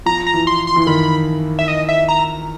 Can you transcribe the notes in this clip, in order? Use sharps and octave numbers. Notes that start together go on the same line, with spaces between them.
F3 A#5
A#5
E3
C6
C6
E3
C6
D#3 B5
E5
D#5
E5
A#5